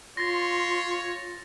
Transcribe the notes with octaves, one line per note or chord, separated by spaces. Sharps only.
F4 C#5 C6 A6 A#6